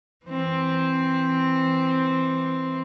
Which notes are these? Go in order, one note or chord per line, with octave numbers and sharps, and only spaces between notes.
E3 C4